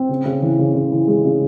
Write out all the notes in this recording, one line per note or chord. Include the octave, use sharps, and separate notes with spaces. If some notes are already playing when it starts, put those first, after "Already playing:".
Already playing: C4
C#3
C#3
E3
C#3
C#3
E3
G#3
C#3